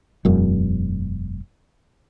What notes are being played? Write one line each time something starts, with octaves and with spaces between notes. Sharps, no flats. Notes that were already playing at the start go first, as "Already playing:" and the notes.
E1 F#2